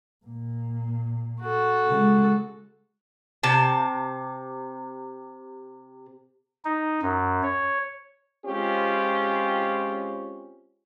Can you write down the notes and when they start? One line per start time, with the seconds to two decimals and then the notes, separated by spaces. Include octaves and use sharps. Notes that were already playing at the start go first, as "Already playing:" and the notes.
0.25 A#2 A#3
1.42 F#4 A4
1.87 C#3 G#3
3.43 C3 A5
6.65 D#4
7.02 F#2
7.43 C#5
8.45 G#3 C4 C#4 F4 G4